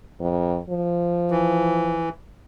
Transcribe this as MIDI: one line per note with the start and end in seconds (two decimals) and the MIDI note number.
0.20 0.59 41
0.70 2.04 53
1.31 2.09 52